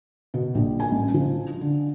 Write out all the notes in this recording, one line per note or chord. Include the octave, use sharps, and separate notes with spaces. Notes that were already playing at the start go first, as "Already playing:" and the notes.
B2
A#1
G#5
A1
F3
D3